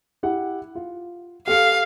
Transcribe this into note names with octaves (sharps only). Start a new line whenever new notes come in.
E4 G4 F#5
F4
G4 A4 F5 C#7